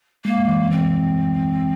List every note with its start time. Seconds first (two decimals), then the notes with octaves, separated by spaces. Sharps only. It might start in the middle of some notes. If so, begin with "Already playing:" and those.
0.25 G#3 A#3
0.48 E3
0.70 E3 C4